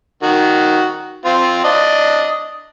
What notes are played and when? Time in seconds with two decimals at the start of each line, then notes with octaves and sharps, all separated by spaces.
0.23 D#3 F#4
1.25 C4 F4
1.64 D4 D#5